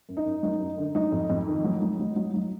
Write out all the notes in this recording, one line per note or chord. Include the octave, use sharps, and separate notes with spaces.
F#2
D#4
F#2
F#3 D#4
F#2
D3
F#3 D#4
F2
F2
D#3
F#3
F#3
F#3
F#3
F#3